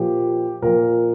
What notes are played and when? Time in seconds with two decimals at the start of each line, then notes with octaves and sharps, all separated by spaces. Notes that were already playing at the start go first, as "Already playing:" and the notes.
Already playing: A#2 F3 G4
0.62 A#2 F3 A#4